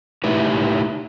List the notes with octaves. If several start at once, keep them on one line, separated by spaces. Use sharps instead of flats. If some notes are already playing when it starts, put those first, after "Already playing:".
A3 D#4 E4 G4 B4